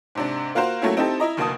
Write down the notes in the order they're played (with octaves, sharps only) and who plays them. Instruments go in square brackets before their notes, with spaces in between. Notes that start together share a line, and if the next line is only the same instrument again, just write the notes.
[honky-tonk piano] G#2 C3 D4
A#3 F4 F#4 A#4 C5
F#3 A3 A#3 C#4 E4
C4 D#4 E4 G4 A4 A5
E4 D#5 A#5
F1 D2 A#3 A5 D#6